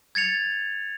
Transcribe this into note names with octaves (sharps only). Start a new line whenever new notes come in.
G#6 A6 C#7 F7